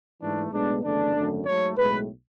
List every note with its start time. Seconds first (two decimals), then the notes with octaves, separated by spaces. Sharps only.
0.20 G#2 E3 A3 D4
0.51 B1 A2 G#3 B3 D4
0.83 F#1 E2 D3 A3 D4
1.14 G#1 F#2 D3 A3
1.45 G#2 F#3 A3 C#5
1.76 B1 A2 G#3 B4